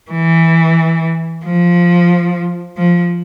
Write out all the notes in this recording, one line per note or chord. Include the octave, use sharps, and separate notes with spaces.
E3
F3
F3